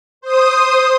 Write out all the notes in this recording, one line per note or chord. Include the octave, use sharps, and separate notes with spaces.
C5 D#6